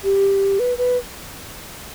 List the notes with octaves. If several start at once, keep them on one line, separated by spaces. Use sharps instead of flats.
G4
B4
B4